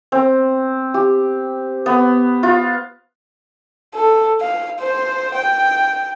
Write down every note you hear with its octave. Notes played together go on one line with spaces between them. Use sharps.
C4
G4
B3
F4
A4
F5
C5
G5